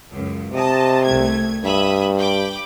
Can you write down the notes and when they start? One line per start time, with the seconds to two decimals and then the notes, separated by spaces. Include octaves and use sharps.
0.10 C#2 F#2
0.53 C3 D#5 A5
1.04 C2 A3 G#6
1.64 G2 E5 B5 D#6
2.18 G5 B5 D6